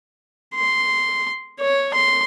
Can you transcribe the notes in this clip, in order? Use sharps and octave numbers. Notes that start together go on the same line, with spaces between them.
C6
C#5
C6